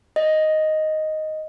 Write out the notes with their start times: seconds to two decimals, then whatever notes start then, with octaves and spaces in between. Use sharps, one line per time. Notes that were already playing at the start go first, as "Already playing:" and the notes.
0.16 D#5